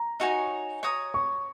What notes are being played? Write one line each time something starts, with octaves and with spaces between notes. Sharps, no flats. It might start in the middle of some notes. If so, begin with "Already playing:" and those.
Already playing: A#5
D#4 F#4 C#5 G#5
C#5 A#5 D#6
C#6